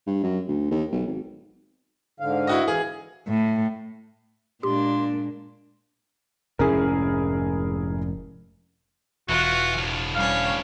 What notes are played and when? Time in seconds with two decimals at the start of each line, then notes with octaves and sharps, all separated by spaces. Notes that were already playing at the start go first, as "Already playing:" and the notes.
0.07 G2
0.23 F#2
0.48 D2
0.71 D#2
0.92 B1
1.07 G#1
2.20 G#2 D3 F5
2.47 E4 F#4 D#5
2.68 E3 G#4 F5
3.27 A2
4.63 A#2 G#3 A#3 D4 G4 C6
6.59 F1 G#2 C#4 E4 G#4 A#4
9.29 E1 E3 F4 F#4
9.78 D2 A2
10.15 G3 C#4 C#5 F5